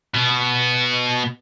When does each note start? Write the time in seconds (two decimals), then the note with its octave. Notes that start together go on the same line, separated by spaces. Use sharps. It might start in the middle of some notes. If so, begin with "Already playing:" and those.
0.14 B2 B3